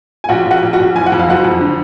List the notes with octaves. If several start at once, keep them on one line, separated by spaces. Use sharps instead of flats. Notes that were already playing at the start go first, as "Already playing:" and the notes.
G#5
A#1 F#4 F#5
A#1
F#4 F#5
A#1
F#4 F#5
A#1
F#1 G#5
F#5
F2
F5
F#1 F#4 F#5
F2
D3